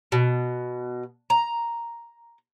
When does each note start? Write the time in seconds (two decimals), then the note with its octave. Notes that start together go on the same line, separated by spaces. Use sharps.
0.12 B2
1.30 A#5